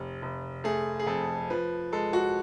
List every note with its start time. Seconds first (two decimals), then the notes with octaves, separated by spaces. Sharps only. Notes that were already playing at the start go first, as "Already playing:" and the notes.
Already playing: F1
0.22 F1
0.64 A3 G#4
0.99 G#4
1.06 F2 A4
1.50 F3 B4
1.92 G#3 A4
2.13 F#4